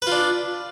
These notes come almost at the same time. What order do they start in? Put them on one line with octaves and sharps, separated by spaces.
B4 F4 D4